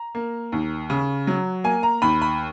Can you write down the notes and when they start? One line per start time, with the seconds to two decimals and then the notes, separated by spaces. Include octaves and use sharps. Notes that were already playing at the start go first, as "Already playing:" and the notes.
Already playing: A#5
0.15 A#3
0.52 D#2
0.90 C#3
1.27 F#3
1.64 A#3 G#5
1.83 A#5
2.02 D#2 B5
2.22 B5